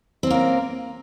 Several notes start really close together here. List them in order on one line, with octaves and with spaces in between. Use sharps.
C4 C#4 A#3 A#4